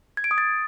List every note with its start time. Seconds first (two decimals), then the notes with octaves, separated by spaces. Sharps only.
0.17 G#6
0.24 D7
0.31 D#6
0.38 A6